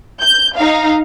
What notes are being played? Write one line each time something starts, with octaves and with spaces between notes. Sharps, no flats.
G6
D#4 F5